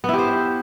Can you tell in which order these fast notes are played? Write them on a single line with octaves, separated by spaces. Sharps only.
B3 E4 G4 C5